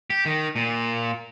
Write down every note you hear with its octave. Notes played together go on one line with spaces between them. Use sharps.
G4
D#3
A#2